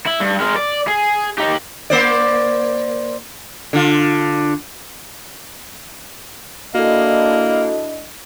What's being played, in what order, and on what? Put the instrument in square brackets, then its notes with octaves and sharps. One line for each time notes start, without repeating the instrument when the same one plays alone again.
[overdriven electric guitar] E4
G2
G#3 A#4
D5
G#4
D#4 G4
[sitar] A#3 C5 D5
D3 F4
[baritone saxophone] A#3 [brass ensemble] D4 E4 D#5 [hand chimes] F#4 A4